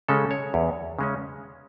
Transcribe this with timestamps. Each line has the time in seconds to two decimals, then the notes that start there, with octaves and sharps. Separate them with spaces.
0.09 C#3 G#3 C#4 A4
0.31 C#5
0.54 E2
0.99 C#3 G#3 C#4